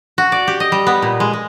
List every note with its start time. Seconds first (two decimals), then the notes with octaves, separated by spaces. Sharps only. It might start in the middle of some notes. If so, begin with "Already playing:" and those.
0.18 F#4
0.32 D5
0.47 G4
0.60 D#5
0.72 G3
0.87 B3
1.02 A#2
1.20 G#3
1.33 G#3